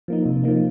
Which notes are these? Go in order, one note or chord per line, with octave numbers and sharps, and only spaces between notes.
F3 A#3 D#4
C3
F3 A#3 D#4